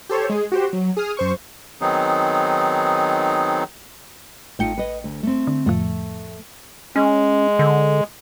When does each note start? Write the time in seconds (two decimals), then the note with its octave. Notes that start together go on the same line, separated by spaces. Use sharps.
0.09 G4 A4 C5 C#5
0.29 G#3 G#4
0.52 F#4 G4 C5
0.73 F#3
0.97 G#4 D#6 F6
1.17 F#2 C5 C#6
1.81 D#3 F#3 B3 C4 D#4 G#4
4.59 A1 A3 D#4 F4 G5 C#7
4.78 B4 D#5
5.04 D2
5.23 A3 C4
5.47 D3
5.66 F2 A2 F3 A3
6.96 G#3 C#4
7.59 D3